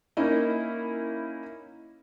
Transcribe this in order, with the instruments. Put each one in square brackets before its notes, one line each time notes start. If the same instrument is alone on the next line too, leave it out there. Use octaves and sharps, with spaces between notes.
[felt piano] A#3 C#4 D#4 E4